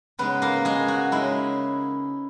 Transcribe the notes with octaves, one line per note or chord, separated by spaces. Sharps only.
C#3 G#3 B3 D#4 B4
A#3 A#4
G#3 G#4
F#4
C#3 G#3 D#4 E4